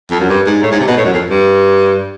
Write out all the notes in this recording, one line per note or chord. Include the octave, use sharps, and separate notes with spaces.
F2
F#2
G2
G#2
A2
G#2
C3
B2
A2
F#2
F2
G2